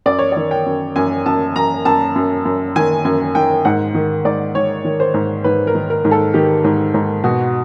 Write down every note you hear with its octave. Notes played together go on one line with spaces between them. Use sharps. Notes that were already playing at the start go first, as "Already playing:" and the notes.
F#2 D5
C#5
D#3 D5
G5
F#2
F#2 G#5
F#2 A5
F#2 A#5
F#2 A5
F#2
F#2
D#3 G#5
F#2 G#5
D#3 G5
G#2 F#5
D#3
G#2 D5
G#2 C#5
D#3
C5
G#2
G#2 B4
A#4
D#3
A#4
G#2
A4
D#3 G4
G#2
G#2
B2 F#4